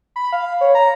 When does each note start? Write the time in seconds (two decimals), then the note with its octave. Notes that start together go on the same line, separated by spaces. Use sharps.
0.16 B5
0.33 F5
0.61 C#5
0.75 A#5